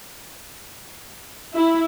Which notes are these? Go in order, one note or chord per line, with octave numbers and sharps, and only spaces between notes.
E4